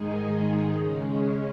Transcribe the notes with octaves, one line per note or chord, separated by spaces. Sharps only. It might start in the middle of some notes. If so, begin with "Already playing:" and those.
Already playing: G#2 D#3 G#3 D#4 G#4
C#3 G#3 C#4